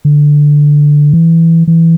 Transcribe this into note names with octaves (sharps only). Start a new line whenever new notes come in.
D3
E3
E3